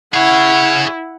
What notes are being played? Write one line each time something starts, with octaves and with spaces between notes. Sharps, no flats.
E4 G#4 C#5 F#5